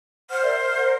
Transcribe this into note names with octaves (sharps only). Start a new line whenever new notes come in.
C5 F#5 F6
A#4 D5 E5
F6
A#4 E5 F#5